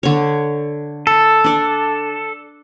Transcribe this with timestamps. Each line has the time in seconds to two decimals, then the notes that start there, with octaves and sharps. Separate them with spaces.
0.03 D3 C#5
1.07 A4
1.44 D4 D5